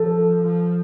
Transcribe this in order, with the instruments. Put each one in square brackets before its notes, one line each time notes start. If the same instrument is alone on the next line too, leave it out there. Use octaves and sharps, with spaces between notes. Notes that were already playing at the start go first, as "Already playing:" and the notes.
Already playing: [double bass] F3 [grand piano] A4
[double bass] F3